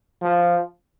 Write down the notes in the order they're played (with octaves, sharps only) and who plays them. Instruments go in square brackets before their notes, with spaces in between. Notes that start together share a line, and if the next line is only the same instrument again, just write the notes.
[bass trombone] F3